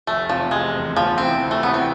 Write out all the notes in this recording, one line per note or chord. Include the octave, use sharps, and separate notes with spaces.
F1 A3
E2 C3 F3
F1 G#3
E2 C3
D2 F3
C3 E3 C4
D2
A3
C3 E3 B3
C4